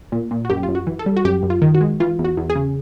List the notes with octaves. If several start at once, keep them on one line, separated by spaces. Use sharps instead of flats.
A#2
A#2
F#4
F#2 G4
F4
F#2
F#4
E3
A4
G3
F#4
F#2 G4
F#2
F4
D#3
F#4
G#3
E3 F4
E2
F#4
E2
G#4
C#3